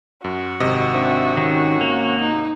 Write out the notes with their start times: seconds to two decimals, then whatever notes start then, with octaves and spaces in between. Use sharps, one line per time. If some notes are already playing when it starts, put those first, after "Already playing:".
0.24 F#2 F#4
0.60 G#1 C3 D#5
0.94 C4 D4 E5
1.37 D#3 C#4
1.81 A#3
2.21 D#4